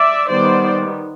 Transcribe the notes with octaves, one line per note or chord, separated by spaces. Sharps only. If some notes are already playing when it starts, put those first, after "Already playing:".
Already playing: D5 E5
D#3 G3 B3 C5 D5